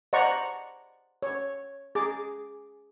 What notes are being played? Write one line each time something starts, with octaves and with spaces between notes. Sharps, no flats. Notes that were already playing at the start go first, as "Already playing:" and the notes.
C5 D5 D#5 F#5 A#5 C#6
C#5
G#4 D6